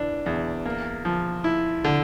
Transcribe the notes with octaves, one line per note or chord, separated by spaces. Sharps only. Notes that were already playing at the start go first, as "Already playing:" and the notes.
Already playing: E3 D4
E2
A#3
F3
E4
D3